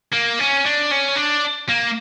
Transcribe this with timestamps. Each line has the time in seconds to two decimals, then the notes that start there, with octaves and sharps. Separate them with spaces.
0.12 A#3
0.39 C#4
0.66 D4
0.91 C#4
1.17 D4
1.69 A#3